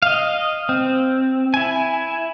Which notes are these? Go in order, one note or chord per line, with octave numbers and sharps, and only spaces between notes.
D#5 F5
C4
E4 G#5